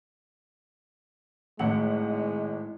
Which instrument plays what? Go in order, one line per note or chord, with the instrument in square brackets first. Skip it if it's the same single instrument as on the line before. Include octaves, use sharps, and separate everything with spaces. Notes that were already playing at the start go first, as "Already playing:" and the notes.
[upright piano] G#1 F#5 F#7 [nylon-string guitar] A2 [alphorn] G#3